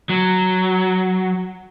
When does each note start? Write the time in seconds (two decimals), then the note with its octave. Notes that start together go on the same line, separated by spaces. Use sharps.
0.09 F#3